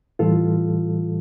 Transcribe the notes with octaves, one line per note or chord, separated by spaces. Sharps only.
A2 E3 G3 F4 A4